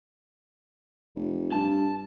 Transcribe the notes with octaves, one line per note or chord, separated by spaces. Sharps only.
F1
G2 A5